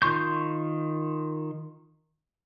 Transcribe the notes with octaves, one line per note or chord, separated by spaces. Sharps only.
D#3 F4 C6 C#6 G6